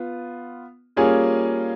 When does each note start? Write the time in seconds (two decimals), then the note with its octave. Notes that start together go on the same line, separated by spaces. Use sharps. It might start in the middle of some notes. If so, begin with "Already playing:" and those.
Already playing: B3 F4
0.97 G3 A#3 C#4 F4 G#4